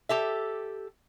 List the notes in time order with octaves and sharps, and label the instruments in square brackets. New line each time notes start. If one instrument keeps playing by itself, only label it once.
[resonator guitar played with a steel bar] G4 A4 E5